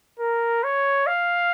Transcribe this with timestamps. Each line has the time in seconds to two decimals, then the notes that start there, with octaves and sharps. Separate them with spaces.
0.19 A#4
0.64 C#5
1.07 F5